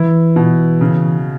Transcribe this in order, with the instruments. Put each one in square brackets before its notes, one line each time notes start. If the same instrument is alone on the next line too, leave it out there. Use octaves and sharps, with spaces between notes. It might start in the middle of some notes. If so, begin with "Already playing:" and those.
Already playing: [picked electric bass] E3 [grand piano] E4
[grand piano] B2
C#3